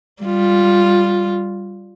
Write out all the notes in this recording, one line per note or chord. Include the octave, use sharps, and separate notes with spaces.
G3 F4